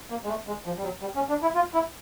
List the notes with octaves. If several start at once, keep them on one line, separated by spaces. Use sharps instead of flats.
A#3
G#3
A3
G#3
F3
G3
F#3
G3
C#4
D4
E4
F4
E4